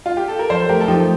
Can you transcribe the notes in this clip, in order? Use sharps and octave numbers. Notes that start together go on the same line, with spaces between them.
F4
G4
A4
A#4
F3 A4 C5
A3 G4 A#4
A4
F3 D#4 G4